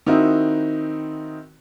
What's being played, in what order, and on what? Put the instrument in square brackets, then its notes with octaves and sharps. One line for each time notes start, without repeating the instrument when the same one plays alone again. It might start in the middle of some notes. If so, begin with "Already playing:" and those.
[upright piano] D#3 C4 D#4 E4 F#4